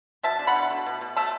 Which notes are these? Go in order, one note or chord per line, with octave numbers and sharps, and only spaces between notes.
B2 E5 A5
D4
F#5 B5
B2
A3
B2
B2
A3 E5 A5